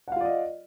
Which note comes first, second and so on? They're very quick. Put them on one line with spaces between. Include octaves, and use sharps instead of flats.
F#5 F5 F4 D5 D#5